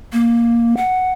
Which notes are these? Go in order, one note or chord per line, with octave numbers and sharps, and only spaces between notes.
A#3
F#5